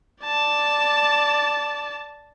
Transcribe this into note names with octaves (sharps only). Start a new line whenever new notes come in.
D5 A5